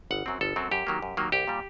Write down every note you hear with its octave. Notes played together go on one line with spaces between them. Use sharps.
G1 F#5
F#2 F#3 C4
G1 A4
F#2 F#3 C4
F#2 G4
D#3 F#3 A#3
F#2
D#3 F#3 A#3
C2 G4
A#2 G3